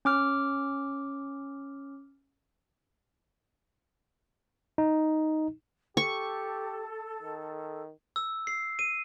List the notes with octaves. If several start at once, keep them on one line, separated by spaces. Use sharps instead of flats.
C#4 D6 F6
D#4
G4 A4 C#6
D#3
E6
C7
D#7